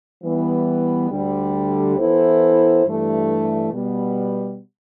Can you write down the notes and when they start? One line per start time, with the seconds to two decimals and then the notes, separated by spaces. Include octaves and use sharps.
0.22 E3 G3 B3
1.10 D2 D3 G3
1.97 E3 B3 E4 A4 C5
2.85 G2 E3 A3
3.71 B2 G3 B3